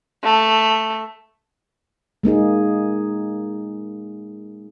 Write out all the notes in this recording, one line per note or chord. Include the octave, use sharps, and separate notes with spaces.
A3
G#3 A#3 D#4 G#4